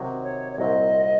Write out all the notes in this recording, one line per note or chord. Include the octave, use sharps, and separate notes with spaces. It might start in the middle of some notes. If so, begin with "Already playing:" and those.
Already playing: C3 D#3 F#3
C#5
C#5
C2 A#2 F#3 C4 D#5